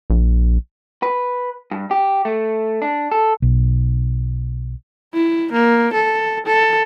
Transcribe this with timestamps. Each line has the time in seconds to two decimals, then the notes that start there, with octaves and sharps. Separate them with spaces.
0.10 A#1
1.03 B4
1.71 G2
1.91 G4
2.25 A3
2.82 D4
3.12 A4
3.42 B1
5.14 E4
5.52 A#3
5.94 A4
6.46 A4